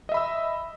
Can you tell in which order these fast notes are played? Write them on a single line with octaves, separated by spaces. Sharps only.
D#5 E5 B5 E6